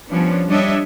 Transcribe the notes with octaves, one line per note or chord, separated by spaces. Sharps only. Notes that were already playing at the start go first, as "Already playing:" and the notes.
F3 G3 B3 C#4 D4
G3 D4 C#5 D#5 E5